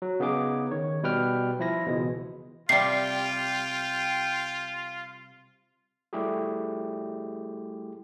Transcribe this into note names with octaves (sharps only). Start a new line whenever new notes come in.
F#3
C#3 B3 D#4 G#4 D6
D#3 C#5
B2 G3 B4 G5 F6
F3 E4 A#6
C#2 B2 E3 G#3
C3 G3 F4 G5 C7
G3 A3 E4 G4 G#4